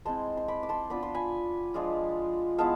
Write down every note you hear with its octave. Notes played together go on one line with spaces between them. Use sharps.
G#3 C4 E4 A5 C6
C6
B5 D6
D6
A5 C6
B3 D4 F4 B5
C6
G#5 B5
F3 G#3 D4 F4
G#3 B3 E4 F5 A5